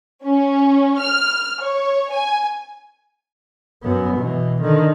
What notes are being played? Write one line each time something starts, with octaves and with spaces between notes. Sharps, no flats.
C#4
F6
C#5
G#5
F#2 B3
B2 E3
D3 D#3